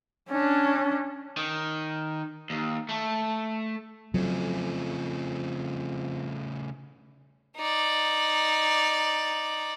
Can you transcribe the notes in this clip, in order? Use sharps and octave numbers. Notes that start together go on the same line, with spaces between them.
C#4 D4
D#3
D#2
A3
F2 C#3 F#3 A3
D#4 D5